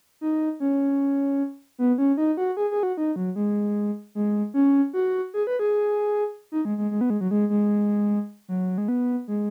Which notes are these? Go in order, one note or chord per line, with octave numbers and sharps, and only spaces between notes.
D#4
C#4
B3
C#4
D#4
F#4
G#4
G#4
F#4
D#4
F#3
G#3
G#3
C#4
F#4
G#4
B4
G#4
D#4
G#3
G#3
G#3
B3
G#3
F#3
G#3
G#3
F#3
G#3
B3
G#3